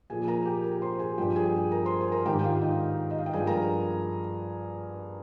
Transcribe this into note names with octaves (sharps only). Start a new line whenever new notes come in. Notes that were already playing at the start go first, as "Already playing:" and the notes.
A#2 F3 G#4 G#5
A#4 A#5
G4 G5
A#4 A#5
C5 C6
G#4 G#5
G2 F3 G4 G5
G#4 G#5
A#4 A#5
C5 C6
G#5
A#4 A#5
G#2 D#3 G4 G5
G5
F4 F5
D#4 D#5
D#5
F5
G5
G2 F3 G#4 G#5
A#4 A#5